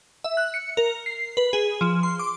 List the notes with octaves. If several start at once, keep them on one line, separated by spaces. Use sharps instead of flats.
E5
F#6
C#7
A#4
C7
B4
G#4
F3
C6
D6